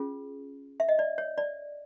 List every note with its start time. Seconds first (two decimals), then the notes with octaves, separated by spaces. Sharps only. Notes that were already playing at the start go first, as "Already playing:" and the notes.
Already playing: C#4 F4 G#4
0.80 E5
0.89 D#5
0.99 D5
1.18 C#5
1.38 D5